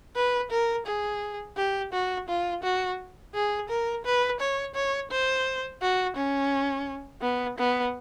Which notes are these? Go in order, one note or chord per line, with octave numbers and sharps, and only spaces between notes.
B4
A#4
G#4
G4
F#4
F4
F#4
G#4
A#4
B4
C#5
C#5
C5
F#4
C#4
B3
B3